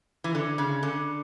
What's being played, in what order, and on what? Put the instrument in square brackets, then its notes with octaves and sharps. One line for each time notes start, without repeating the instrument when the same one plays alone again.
[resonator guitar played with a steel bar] E3
D3
C#3
D3